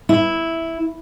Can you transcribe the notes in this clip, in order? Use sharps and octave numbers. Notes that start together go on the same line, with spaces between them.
E4